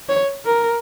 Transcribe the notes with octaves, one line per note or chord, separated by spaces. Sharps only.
C#5
A#4